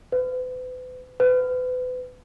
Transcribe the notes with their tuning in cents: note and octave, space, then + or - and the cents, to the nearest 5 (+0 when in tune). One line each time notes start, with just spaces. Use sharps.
B4 +40
B4 +35